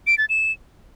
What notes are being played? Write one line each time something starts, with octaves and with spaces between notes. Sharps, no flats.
D7
A6
E7